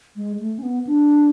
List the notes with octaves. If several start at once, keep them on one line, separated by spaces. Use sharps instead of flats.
G#3
A3
C#4
B3
D4